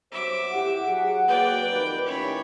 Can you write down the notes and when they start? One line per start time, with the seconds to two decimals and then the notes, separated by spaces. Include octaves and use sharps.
0.12 G2 F#3 C5 E5 D6
0.51 A2 G4 F#5
0.86 F#3 G#4
1.28 F#3 A#3 B4 D5 G5
1.69 F2 D#3 G4 B4
2.06 A2 D#3 C#4 C#5 B5